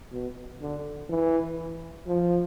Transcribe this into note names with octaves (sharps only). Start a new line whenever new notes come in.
B2
D3
E3
F3